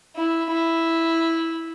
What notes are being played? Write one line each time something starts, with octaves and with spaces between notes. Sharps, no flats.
E4
E4